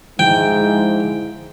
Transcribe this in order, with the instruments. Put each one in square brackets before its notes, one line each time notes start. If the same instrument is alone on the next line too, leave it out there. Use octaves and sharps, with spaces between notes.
[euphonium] G#2 [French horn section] F3 G#3 E4 [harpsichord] G5